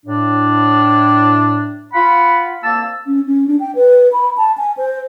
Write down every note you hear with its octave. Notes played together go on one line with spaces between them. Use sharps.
A2 D4
F4 F#5 B5
C2 A#3 A5 E6
C#4
C#4
D4
G5
B4
B5
A5
G#5
C5